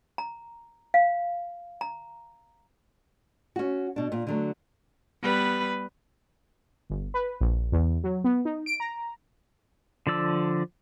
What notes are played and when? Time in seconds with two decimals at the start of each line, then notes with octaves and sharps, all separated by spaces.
0.18 A#5
0.94 F5
1.81 A#5
3.56 C#4 F#4
3.96 B2 D4
4.12 A#2
4.27 D3 F#3 A3
5.22 G3 B3 B4
6.90 G1
7.14 B4
7.40 A#1
7.72 E2
8.04 F#3
8.24 B3
8.45 D#4
8.66 D7
8.80 A#5
10.07 D3 F3 D5 E6